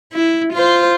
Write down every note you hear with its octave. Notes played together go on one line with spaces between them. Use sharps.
E4
F4 C5